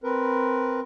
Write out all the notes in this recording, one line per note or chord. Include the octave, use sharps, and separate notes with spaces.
C4 A#4 B4